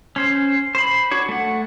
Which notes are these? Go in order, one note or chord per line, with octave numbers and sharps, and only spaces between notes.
C#4 C5
C5 B5
D4 F#4 C#5
A3 F#5